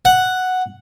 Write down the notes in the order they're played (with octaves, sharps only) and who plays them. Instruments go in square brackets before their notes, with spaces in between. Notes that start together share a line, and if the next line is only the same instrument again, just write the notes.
[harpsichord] F#5